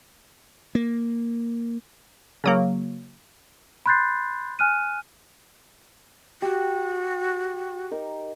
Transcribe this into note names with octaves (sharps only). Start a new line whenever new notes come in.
A#3
C#3 F#3 A#3
B5 C6 F#6 G6 A6 C7
G#5 F6 F#6 D#7
F#4 G4
D#4 A#4